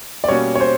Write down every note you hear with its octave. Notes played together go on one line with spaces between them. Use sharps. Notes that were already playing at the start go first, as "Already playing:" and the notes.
D5
B2 G3 A#3 C#4 F#4 C#5
C#5
C5